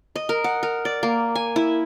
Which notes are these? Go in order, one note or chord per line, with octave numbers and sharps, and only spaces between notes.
D#5
A#4
F#5
A#4
D5
A#3
G#5
E4